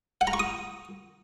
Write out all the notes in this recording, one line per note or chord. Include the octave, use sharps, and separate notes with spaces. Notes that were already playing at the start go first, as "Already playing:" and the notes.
F#5
A#5
C#6
D#6